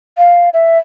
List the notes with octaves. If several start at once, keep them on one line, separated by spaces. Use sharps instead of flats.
F5
E5